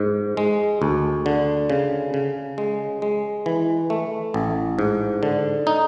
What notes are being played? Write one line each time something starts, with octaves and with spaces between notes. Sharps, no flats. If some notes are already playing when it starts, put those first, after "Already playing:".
Already playing: G#2
G#3
D2
D3
C#3
C#3
G#3
G#3
E3
A3
A1
G#2
D3
D#4